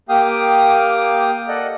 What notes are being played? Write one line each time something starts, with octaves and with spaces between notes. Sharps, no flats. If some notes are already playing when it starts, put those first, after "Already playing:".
A#3 G4 F5 G5 D6 D#6
A4 D5 D#5 F#5